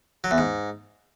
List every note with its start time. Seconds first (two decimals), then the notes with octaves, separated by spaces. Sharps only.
0.24 F#3
0.31 E2
0.38 G#2